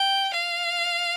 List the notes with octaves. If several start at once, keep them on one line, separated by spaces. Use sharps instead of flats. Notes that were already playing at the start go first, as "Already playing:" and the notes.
Already playing: G5
F5